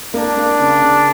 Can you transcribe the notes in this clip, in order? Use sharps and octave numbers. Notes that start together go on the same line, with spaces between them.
A#3 D4
A#3
C#3
C#3